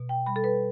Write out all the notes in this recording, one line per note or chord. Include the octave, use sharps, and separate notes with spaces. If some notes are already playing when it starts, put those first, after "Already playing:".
Already playing: B2
G5
G3 B5
A4
B4